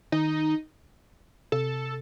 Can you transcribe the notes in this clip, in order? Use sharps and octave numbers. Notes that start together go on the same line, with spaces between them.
D#3 D#4
C3 A4